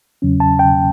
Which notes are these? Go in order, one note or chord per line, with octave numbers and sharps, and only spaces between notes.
E2 C#3 F#3 C#4
A5
G5